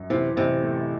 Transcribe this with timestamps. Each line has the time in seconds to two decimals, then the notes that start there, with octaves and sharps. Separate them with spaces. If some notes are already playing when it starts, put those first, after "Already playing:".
Already playing: F#2
0.10 C3 E3
0.36 A1 C3
0.63 A3